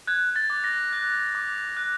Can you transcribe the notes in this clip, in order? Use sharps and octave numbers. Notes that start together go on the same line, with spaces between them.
F#6 G#6
A6
D6
A#6
F#6
D6
F#6